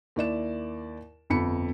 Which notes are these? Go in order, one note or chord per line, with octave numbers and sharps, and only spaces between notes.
D#2 E4 D5 E7
G1 F2 B5 C#7